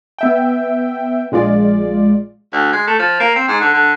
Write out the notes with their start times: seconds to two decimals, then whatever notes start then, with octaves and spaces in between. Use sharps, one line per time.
0.18 B3 E5 G5
1.32 A#1 G#3 F4 D5
2.53 D2
2.73 G#3
2.87 A3
2.99 F3
3.20 A#3
3.36 C4
3.48 G#2
3.61 D3
3.73 D3